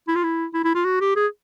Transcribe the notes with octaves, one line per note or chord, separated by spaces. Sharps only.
E4
F4
E4
E4
E4
F4
F#4
G4
G#4